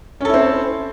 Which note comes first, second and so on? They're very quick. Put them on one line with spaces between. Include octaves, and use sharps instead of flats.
C#4 A4 E4 C4